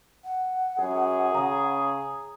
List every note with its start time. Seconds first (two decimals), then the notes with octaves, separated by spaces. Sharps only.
0.24 F#5
0.79 F#2 G#4
1.35 C#3 A#5 D#6